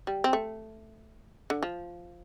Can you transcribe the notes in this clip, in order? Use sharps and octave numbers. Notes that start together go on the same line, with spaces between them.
G3
C4
A3
D3
F3